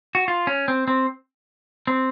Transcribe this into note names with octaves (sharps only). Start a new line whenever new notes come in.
F#4
F4
C#4
C4
C4
C4